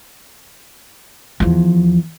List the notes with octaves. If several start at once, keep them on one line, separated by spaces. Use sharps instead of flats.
E2 F3